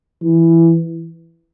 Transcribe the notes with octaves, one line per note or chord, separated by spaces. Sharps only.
E3